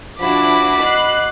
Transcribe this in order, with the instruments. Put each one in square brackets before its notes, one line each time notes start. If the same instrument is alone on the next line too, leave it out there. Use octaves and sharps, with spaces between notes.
[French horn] F3 [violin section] D4 E4 [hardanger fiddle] F#4 B5 [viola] D6
[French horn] D#5 [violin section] F#6 C7